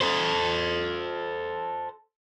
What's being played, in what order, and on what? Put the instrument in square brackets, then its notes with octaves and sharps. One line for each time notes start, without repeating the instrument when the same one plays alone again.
[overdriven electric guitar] A4 C5